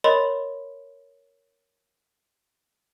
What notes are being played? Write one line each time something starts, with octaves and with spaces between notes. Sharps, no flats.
A#4 C#5 D#5 B5 C6